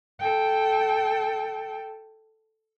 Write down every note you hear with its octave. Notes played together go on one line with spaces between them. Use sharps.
A4 G5